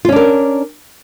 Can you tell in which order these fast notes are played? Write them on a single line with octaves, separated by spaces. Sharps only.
F4 C#4 D4 A#4